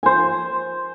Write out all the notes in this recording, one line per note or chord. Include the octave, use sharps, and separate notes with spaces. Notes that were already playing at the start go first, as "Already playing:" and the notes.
C5 G#5